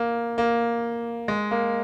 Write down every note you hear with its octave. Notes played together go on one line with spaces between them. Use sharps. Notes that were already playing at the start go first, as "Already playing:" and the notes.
Already playing: A#3
A#3
G#3
A#3